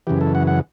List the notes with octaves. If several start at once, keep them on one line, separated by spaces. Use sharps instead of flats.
F#2 C#3 E3 G4
A4
F#5
F#5